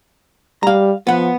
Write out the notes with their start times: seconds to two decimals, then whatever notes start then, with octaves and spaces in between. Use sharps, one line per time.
0.63 G3 F5 A#5
1.07 F3 B3 F#5